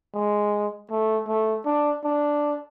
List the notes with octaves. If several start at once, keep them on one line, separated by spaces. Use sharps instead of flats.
G#3
A3
A3
D4
D4